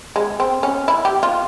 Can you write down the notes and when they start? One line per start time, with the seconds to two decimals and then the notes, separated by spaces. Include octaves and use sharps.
0.16 G#3
0.40 C4
0.63 C#4
0.88 E4
1.05 G4
1.23 F4